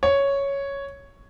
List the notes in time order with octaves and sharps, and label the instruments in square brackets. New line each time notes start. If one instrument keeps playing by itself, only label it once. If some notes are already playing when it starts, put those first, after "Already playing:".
[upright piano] C#5